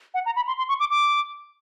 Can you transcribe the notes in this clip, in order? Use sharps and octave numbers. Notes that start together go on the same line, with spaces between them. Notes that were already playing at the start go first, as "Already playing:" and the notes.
F#5
A#5
B5
C6
C6
C#6
D6
D6